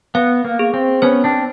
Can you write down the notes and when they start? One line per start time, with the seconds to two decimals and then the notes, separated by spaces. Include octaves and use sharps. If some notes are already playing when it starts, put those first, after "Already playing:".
0.15 B3 F5
0.45 A#3
0.59 G#4
0.74 C4
1.02 B3 C#4 C5
1.24 C4 D4